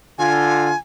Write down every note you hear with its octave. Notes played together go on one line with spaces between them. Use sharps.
D3 F4 G#5